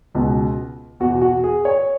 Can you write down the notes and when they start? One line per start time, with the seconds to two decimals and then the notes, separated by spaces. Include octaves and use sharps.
0.15 C#2 B2
1.00 E2 B2 F#4
1.21 F#4
1.44 G#4
1.65 C#5